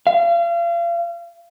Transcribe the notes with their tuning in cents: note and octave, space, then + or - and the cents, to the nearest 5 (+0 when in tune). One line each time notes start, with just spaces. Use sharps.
F5 -35